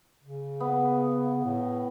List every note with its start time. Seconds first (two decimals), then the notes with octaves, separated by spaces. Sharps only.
0.24 C#3
0.60 B3
1.45 A2